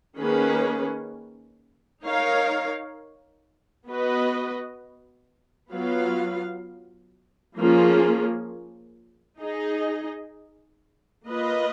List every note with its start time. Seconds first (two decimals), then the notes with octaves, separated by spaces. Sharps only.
0.17 D#3 A#3 C#4 G#4 B4
2.02 D#4 A#4 C#5 F5
3.86 B3 F#4 B4 D#5
5.72 F#3 B3 F4 B4 F5
7.56 F3 A#3 C#4 F4 G#4
9.40 D#4 G#4 D#5
11.26 A#3 F4 B4 D#5